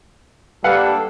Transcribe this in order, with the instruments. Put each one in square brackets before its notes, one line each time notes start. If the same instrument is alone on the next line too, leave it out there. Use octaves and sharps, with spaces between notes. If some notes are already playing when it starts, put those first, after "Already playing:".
[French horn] G3 [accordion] A#3 D4 A4 [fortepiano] B4 F5 F#5